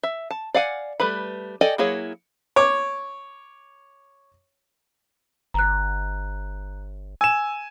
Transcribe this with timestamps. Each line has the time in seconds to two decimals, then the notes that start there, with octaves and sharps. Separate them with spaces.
0.03 E5
0.31 A5
0.54 D5 F5 F#5 G#5
1.00 G3 A3 B4 B5
1.61 A4 D5 D#5 G5 G#5
1.78 F#3 A#3 E4 G#4 C#5
2.56 C#5 D6
5.54 G1 A#5 F#6
7.21 G#5 E6 E7